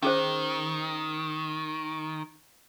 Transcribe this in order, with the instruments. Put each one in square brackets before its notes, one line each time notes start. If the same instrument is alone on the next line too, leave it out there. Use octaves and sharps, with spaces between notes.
[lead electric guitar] D#3 [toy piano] C#4 G#4 C5